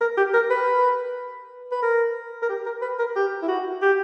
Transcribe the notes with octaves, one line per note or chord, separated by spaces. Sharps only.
A#4
G4
A#4
B4
B4
A#4
A#4
G4
A#4
B4
A#4
G4
E4
F#4
G4